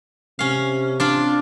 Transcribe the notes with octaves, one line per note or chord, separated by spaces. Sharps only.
C3 C#4 F5
D4 F4